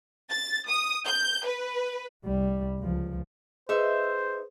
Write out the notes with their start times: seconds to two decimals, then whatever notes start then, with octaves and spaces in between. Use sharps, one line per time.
0.31 A6
0.69 D#6
1.07 G6
1.46 B4
2.25 C2 G3
2.79 C#2 F3
3.69 D#4 G#4 B4 C5 E5